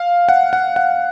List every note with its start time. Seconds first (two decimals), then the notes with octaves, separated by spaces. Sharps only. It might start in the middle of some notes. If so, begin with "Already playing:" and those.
Already playing: F5
0.29 F#5
0.53 F#5
0.76 F#5